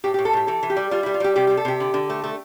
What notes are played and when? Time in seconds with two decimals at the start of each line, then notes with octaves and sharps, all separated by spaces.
0.04 A2 G4
0.14 G4
0.19 A2
0.25 A4
0.33 A2 G4
0.47 E3 A4
0.63 E3
0.70 G4
0.76 G3
0.91 G3 F4
1.03 E4
1.06 G3
1.14 F4
1.20 G3 G4
1.36 C3 G4
1.47 G4
1.50 C3
1.57 A4
1.65 C3 G4
1.80 D3
1.94 D3
2.10 A3
2.24 A3